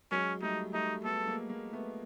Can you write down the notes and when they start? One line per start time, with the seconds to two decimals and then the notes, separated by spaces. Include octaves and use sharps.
0.12 F#3 G#3 C#4
0.42 G3 A3 D#4
0.73 G3 A3 D#4
1.04 A3 B3 A4
1.27 G#3 A#3
1.49 G#3 A#3
1.73 A3 B3